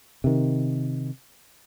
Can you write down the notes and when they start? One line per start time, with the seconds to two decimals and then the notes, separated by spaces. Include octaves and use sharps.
0.24 C3 D#3